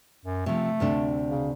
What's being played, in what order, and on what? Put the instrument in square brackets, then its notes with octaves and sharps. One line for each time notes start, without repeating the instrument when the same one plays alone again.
[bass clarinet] F#2
[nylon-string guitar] C3 F3 [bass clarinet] A3
[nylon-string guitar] D2 C3 D4
[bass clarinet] C#3